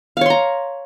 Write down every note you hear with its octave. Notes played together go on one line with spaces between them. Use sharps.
C#5 F5 A#5 C6